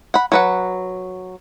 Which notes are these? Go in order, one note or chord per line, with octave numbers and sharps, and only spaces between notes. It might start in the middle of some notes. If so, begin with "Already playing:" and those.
F#5 B5
F#3 B4 F#5